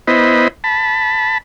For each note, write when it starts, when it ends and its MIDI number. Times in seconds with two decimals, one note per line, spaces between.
0.07 0.48 59
0.07 0.48 64
0.07 0.48 72
0.07 0.48 75
0.07 0.48 83
0.64 1.38 81
0.64 1.38 83